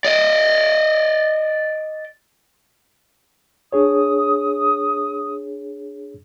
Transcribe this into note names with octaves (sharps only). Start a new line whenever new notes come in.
D5 D#5
D4 G#4 C#5 D#6